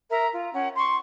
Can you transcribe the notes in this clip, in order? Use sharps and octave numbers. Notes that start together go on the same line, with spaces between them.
A#4 E5 A#5
F4
C#4 F#5
C6 C#6